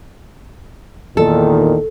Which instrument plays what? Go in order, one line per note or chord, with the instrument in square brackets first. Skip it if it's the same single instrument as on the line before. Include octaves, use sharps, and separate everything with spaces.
[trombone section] E2 A#2 D#3 [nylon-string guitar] A4